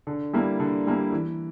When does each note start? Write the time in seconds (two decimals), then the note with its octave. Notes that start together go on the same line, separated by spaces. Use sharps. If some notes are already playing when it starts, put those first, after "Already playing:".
0.07 D3
0.34 G3 A#3 E4
0.60 D3
0.87 G3 A#3 E4
1.12 E3